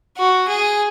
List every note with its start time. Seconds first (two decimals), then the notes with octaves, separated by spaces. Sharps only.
0.17 F#4
0.48 G#4